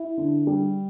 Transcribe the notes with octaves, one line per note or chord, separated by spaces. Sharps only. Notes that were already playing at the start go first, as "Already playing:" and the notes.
Already playing: E4
D3
G3